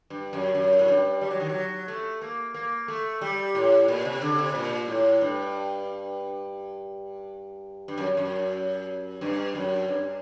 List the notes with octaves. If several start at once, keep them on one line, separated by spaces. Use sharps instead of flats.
G2
F#2
F#2
A2
G2
G3
F#3
D#3
F#3
A3
A#3
A#3
A3
G3
A2
A#2
C3
D3
C3
A#2
A2
G2
G2
F#2
F#2
G2
F#2
G2